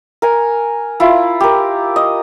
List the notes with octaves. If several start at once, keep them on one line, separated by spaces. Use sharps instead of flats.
A#4 G#5
E4 F4
G4 A#4
D#5